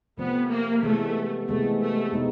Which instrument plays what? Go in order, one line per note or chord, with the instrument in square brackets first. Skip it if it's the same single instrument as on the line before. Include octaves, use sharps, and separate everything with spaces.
[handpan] C3 F3 A3 C4 [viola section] B3
[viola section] A#3
[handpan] C3 E3 G#3 B3 [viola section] A3
[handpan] C3 E3 G#3 B3 [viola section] A3
[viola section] A3
[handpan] B2 G#3 B3 D#4